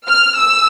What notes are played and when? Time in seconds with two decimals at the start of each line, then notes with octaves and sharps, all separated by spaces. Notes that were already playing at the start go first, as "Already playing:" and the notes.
0.08 F6
0.38 E6